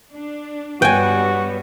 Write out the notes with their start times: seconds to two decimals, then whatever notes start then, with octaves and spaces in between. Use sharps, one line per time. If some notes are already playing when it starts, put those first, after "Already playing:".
0.11 D4
0.82 G2 G3 B3 F#4 B4 C#5 G5 G#5